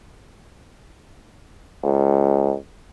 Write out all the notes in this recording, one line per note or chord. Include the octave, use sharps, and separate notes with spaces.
C#2